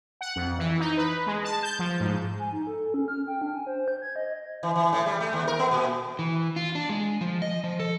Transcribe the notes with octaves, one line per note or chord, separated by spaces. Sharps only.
F#5
F2
E3
D#4
B4
G#3
A5
G6
F3
G#2
G#5
D#4
A4
C#4
F6
G5
D4
G#5
C5
G6
G#6
D#5
E3
E3
A2
G3
A3
D#2
A#4
B3
A#2
E3
F4
D4
G#3
F3
D#5
F3
A4